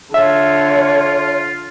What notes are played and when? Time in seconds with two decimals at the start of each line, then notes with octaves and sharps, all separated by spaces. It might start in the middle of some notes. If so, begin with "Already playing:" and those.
0.14 D3 F4 C#5 E5